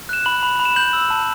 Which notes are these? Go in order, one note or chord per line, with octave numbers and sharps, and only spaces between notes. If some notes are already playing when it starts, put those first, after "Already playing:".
F#6 E7
B5 F#7
B5
B5
E7
G6 F#7
E6
A5